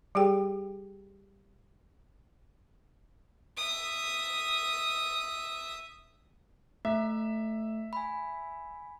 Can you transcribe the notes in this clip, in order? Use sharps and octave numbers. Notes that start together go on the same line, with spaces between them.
G3 G4 G#4 G5
E5 D#6
A3 E5
G#5 B5